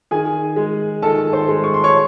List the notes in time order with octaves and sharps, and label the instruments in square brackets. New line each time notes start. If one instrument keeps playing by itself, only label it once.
[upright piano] D#3 G#4 G#5
G#3
D#3 A4 A5
C5 C6
G#3
C#6
C6
C#5 C#6